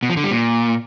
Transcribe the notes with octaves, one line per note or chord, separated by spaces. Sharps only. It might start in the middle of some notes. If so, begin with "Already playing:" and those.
B2
F3
D3
G3
A#2